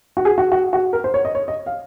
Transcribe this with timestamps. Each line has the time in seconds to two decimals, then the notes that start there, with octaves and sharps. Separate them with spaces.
0.17 F#4
0.25 G#4
0.38 F#4
0.52 F#4
0.73 F#4
0.93 A#4
1.04 C5
1.14 C#5
1.25 D#5
1.35 C#5
1.48 D#5
1.66 F5